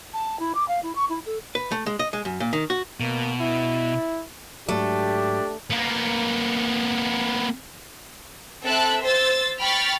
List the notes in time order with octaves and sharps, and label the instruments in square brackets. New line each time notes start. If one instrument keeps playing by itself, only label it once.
[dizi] A5
E4
D6
F5
E4
C#6
E4
A4
[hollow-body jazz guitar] B4
A3
G#3
D#5
G#3
F#2
A#2
D#3
F#4
[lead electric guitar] B2 [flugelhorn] A#3
[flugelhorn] E4
[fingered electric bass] G#2 F#3 [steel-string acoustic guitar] A3 [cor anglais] D4 [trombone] G4
[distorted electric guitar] A#3 B3
[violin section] C4 A4 E5 A5 F#6
C5 E6 A6
G5 B5 C#6 F6 A6